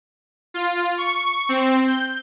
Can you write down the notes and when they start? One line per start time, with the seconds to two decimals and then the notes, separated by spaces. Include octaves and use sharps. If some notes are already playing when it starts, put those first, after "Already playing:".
0.54 F4
0.98 C#6
1.49 C4
1.88 G6